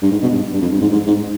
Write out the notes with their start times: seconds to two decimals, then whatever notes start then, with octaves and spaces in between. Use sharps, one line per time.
0.02 G2
0.12 G#2
0.23 B2
0.33 G2
0.53 G2
0.62 F2
0.72 G2
0.82 G#2
0.92 G#2
1.07 G#2